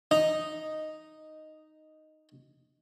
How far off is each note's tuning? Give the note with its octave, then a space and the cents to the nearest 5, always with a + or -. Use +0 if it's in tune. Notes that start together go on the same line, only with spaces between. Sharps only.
D#4 -5 D#5 +0